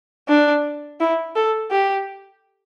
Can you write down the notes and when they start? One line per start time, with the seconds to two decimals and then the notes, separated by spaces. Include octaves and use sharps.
0.28 D4
1.00 E4
1.35 A4
1.71 G4